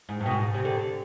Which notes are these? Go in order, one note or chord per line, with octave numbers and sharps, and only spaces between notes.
G#2
G2
B2
G#2
C3
D3